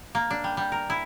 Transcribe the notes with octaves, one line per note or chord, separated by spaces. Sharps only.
A#3
D4
G3
G3
A#4
E4